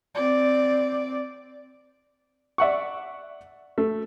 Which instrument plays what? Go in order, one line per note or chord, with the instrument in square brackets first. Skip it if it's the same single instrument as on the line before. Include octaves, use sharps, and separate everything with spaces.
[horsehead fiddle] C4 D5
[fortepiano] D5 E5 F#5 C#6
A3